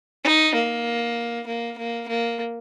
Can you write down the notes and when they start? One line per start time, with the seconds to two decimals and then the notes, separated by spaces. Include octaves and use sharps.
0.24 D#4
0.55 A#3
1.47 A#3
1.78 A#3
2.08 A#3